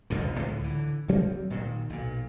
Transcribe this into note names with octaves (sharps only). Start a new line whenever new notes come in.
A1 E2 B2 D3
C#2 A2
D3 E3
D2 F#3 C4
A#2 D#3
B1 A#2